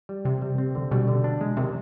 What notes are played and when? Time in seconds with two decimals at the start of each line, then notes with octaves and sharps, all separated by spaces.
0.09 G3
0.25 C3 C4
0.42 G3
0.58 C4
0.75 D3
0.91 B2 G3
1.08 D3
1.24 D4
1.41 G#3
1.57 C3 D#3